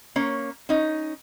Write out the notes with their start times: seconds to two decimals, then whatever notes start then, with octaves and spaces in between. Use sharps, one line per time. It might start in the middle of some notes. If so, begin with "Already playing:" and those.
0.16 A#3 C#4 C#5
0.69 C#4 D#4